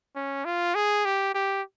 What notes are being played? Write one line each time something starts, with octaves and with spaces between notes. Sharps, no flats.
C#4
F4
G#4
G4
G4